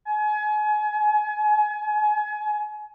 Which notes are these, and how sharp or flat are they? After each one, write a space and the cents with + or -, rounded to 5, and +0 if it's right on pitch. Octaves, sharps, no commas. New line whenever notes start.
G#5 +30